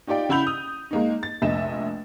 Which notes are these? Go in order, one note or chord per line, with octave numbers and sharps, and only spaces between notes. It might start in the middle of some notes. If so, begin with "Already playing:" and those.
D#4 F4 G4 D5 G5
C#3 E4 F#5 B5 G6 F7
D#6
G#3 A#3 D#4
A6
F1 A#1 D#5 E5 E7